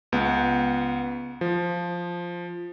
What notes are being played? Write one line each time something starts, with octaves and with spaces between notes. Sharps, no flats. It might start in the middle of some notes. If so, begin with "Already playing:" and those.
C#2 B3
F3